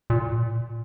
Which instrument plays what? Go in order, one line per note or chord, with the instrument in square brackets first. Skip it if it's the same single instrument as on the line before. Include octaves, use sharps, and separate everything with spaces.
[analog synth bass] A#2